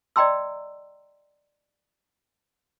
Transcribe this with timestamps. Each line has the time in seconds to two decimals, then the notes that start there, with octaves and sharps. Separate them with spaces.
0.16 D5 D#5 G5 A#5 C6 E6